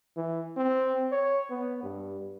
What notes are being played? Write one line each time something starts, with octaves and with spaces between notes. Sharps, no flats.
E3
C4
C#5
B3
G2